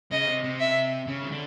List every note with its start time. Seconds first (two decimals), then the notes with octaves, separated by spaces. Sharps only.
0.12 C#3 D#5
0.28 C3
0.44 C3
0.60 E5
1.07 C#3
1.22 D#3
1.31 D3